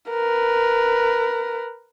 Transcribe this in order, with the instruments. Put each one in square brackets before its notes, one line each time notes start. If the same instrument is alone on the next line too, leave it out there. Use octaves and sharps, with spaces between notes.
[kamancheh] A#4 B4